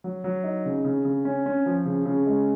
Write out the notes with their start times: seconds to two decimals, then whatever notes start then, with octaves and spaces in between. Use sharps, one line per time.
0.04 F#3
0.24 F#3
0.44 D#4
0.65 C#3
0.84 C#3
1.05 C#3
1.25 C#4
1.46 C#4
1.66 F3
1.85 C#3
2.06 C#3
2.26 G#3